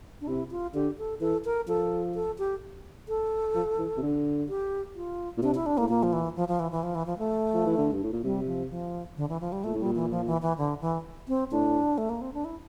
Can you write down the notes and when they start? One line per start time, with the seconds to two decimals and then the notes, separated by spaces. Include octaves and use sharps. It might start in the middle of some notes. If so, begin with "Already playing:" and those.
0.21 D4
0.28 C3 E4
0.51 F4
0.74 D3 G4
0.98 A4
1.21 E3 A4
1.45 A#4
1.67 F3 A4
2.15 A4
2.38 G4
3.08 A4
3.55 F3
3.78 E3
3.97 C3
4.02 D3
4.49 G4
4.96 F4
5.37 A#2
5.42 C3 D4
5.55 E4
5.66 D4
5.78 A2 A#3
5.89 A#2 A#3
6.03 F3
6.13 E3
6.36 F3
6.48 F3
6.59 E3
6.71 E3
6.83 F3
6.95 E3
7.06 F3
7.18 A3
7.54 F3
7.66 E3
7.77 D3
7.92 G2
8.03 A2
8.13 A#2
8.24 C3 G3
8.47 F3
8.70 F3
9.17 D3
9.29 E3
9.41 F3
9.52 G3
9.64 A#2 A3
9.74 A2
9.80 A#2 G3
9.95 E3
10.10 F3
10.26 E3
10.42 E3
10.58 D3
10.81 E3
11.28 C4
11.52 A2 D4
11.98 A3
12.09 A#3
12.21 C4
12.33 D4
12.45 E4